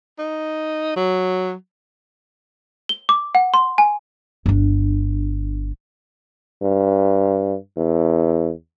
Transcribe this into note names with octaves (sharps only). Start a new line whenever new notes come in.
D#4
F#3
G7
D6
F#5
C6
G#5
G1 D4
G2
E2